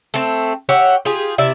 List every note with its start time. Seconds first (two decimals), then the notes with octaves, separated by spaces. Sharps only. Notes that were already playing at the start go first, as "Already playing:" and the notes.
0.14 A3 C4
0.69 G4 C#5 E5 F#5
1.05 F4 G4 G#4
1.38 C3 E4 D5 E5